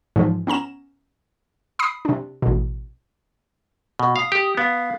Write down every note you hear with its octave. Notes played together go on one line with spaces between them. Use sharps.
G#2 E3 F3
B3 C#4 A#5 E7
B5 D#6 C7
C3 D4
A1 B2
B2
F5 D#6
G4
B3 F5